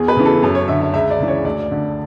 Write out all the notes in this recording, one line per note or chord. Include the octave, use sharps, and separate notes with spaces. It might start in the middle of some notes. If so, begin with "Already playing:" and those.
Already playing: E2 G#4
B4
C#3 E3
A4
F#2 A4
C#5
D3 E5
E5
C#2 E5
D5
C#3 E3
C#5
D2 D5
D3